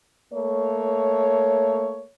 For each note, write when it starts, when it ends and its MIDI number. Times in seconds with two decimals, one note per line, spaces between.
0.33 2.05 57
0.33 2.05 58
0.33 2.05 73